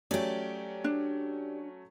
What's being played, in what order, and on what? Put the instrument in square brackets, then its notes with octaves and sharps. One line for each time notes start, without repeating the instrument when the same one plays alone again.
[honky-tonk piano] F#3 A3 C#4 [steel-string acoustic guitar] G4 D5
[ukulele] D4